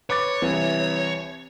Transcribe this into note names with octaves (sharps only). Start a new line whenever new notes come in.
B4 C#5 D6 A6
C2 E3